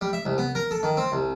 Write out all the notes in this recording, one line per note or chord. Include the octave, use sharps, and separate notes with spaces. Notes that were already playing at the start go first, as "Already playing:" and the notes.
G3
E5
C2
B3
A#4
A4
D#3
C4
C2